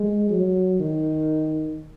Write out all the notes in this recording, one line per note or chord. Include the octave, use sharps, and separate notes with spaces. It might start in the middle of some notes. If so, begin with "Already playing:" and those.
Already playing: G#3
F#3
D#3